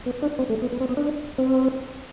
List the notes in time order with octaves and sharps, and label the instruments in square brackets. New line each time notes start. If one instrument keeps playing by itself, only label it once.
[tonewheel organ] B3
D4
C4
A3
B3
B3
C4
B3
D4
C4